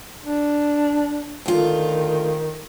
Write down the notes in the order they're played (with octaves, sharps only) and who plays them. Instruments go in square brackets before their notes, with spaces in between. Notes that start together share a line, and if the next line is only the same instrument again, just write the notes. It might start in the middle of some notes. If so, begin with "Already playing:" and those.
[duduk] D4
[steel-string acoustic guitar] D2 F4 [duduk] D#3